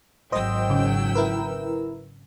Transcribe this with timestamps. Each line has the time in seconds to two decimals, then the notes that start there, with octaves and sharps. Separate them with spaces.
0.32 G#1 F#3 C5 D#5 G5 E6
0.70 C#3
1.15 E4 A#4 B4